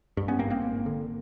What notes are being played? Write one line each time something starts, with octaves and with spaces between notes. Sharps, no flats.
G2
B3 C#4
G#1 A#3 C4
A#3 C4
G#1
D3